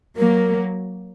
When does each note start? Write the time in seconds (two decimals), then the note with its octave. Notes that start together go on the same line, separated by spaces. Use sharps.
0.17 F#3 A#3 A#4